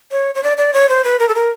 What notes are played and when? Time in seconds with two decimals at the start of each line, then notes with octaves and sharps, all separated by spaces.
0.12 C#5
0.35 C#5
0.43 D5
0.58 D5
0.74 C#5
0.89 C5
1.04 B4
1.19 A#4
1.29 A4
1.35 A#4